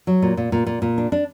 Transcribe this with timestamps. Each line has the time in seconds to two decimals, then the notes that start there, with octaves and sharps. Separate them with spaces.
0.07 F#3
0.22 A#2
0.37 A#2
0.52 A#2
0.67 A#2
0.82 A#2
0.98 D4
1.12 D4